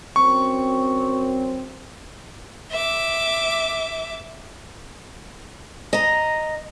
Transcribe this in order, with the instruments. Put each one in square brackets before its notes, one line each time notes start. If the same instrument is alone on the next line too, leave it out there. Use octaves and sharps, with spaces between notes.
[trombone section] F#2 C4 [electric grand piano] C#6
[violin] E5 D6
[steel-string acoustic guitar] D#5 A#5